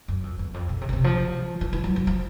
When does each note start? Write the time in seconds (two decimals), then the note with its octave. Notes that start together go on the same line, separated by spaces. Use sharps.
0.08 F#2
0.23 F2
0.39 E2
0.54 F2
0.69 B2
0.81 C3
0.89 C#3
0.93 C3
1.04 F3
1.61 E3
1.73 E3
1.84 F#3
1.96 F#3
2.07 F3